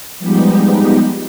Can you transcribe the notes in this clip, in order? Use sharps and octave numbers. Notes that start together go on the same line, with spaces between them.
F3 G3 G#3 B3 D#4 G4